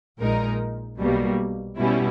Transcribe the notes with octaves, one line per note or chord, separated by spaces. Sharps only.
A#1 A#2 G#3 D#4 A#4
B1 B2 G3 A#3
B2 G3 C#4 E4